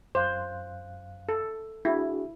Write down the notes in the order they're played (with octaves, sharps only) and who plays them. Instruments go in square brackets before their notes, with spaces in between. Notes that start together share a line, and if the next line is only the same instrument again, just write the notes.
[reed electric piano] F#2 F5 F#6 [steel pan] C5
[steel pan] A4
[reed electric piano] D4 F#4 G#4 [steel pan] E4